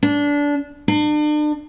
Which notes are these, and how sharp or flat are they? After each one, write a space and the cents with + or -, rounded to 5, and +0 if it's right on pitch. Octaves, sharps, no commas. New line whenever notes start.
D4 -20
D4 +40